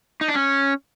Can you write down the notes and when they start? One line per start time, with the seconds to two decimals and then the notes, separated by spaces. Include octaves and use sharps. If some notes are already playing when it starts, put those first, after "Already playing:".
0.21 D#4
0.28 D4
0.35 C#4